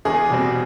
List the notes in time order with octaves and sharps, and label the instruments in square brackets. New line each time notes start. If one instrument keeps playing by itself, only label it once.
[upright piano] E2 G#4
B2 G3 C4